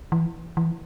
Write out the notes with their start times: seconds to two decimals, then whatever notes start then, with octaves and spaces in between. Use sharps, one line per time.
0.12 E3
0.57 E3